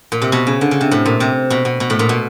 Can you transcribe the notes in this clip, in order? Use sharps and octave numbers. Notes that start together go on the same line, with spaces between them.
A#2
C3
B2
C#3
D3
C#3
C3
A2
A#2
C3
B2
B2
B2
A2
A#2
B2